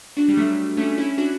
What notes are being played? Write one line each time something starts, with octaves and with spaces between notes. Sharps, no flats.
D4 F#4
G3
F#3 A3
A3 C#4
C#4 E4
D4 F#4